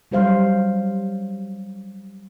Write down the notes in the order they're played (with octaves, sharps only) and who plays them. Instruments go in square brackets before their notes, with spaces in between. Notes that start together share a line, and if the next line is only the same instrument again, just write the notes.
[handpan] F#3 G3 C5 F5